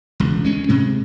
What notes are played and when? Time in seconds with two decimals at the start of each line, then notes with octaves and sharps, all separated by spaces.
0.20 E1 C#2
0.44 D2 G#3 C#4
0.69 G#2 C3 G#3